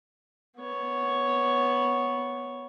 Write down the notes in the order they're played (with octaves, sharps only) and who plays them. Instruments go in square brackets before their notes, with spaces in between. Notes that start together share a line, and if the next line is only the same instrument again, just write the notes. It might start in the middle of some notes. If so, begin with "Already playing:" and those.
[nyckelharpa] B3 C#5